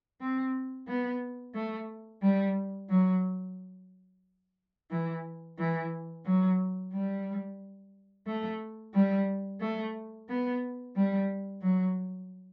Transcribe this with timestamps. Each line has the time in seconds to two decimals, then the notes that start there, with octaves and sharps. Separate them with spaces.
0.21 C4
0.88 B3
1.55 A3
2.22 G3
2.89 F#3
4.91 E3
5.58 E3
6.25 F#3
6.93 G3
8.27 A3
8.94 G3
9.61 A3
10.29 B3
10.96 G3
11.62 F#3